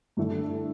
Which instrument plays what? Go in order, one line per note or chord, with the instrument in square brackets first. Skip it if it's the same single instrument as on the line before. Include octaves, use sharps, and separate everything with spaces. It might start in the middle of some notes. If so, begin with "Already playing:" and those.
[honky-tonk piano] G2 D3 A3 E4 A4